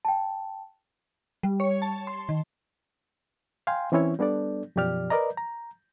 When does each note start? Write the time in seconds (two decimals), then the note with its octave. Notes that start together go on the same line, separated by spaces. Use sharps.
0.05 G5 A5
1.43 G3
1.60 C#5
1.82 A5
2.07 C6
2.29 D#3
3.67 F5 G5 G#5 C6
3.92 E3 C4 C#4 E4 C#5
4.19 G3 B3 D4 A4 D5
4.76 F#2 B2 F3 G4 D5 F6
5.10 A#4 B4 D5 D#5 A#5
5.37 A#5